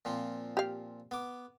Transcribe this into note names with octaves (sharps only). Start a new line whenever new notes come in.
A#2 F3 C4
G4 F5
B3 D6